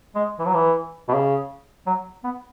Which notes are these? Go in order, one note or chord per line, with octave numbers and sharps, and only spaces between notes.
G#3
E3
F#3
E3
B2
C#3
F#3
B3